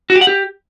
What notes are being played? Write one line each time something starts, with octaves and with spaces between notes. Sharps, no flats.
F#4
G4
F#5
G4